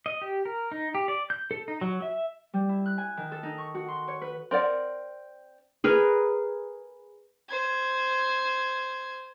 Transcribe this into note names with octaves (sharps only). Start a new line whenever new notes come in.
D#5
G4
A#4
D#4
G4
D5
G6
A4
D#4
F#3
E5
G3
E4
F#6
G#5
D#3
A4
D#4
C#6
F#4
C6
C#5
B4
C4 A#4 D5 F#5
G#4 A#4 B4
C5 G#6